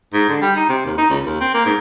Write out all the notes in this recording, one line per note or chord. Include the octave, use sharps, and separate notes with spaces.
G#2
D3
G3
D#4
C3
D#2
D#4
C#2
D#2
C4
A#3
G#2